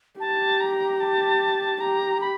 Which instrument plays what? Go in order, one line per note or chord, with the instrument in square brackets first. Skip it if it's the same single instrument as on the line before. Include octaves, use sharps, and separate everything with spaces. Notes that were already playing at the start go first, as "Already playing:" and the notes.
[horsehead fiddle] G4 [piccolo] A5
[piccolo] A#5
A5
[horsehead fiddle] G4 [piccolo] A#5
[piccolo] B5